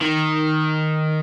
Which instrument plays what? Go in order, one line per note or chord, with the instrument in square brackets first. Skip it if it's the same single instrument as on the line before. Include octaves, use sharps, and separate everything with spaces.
[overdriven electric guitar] D#3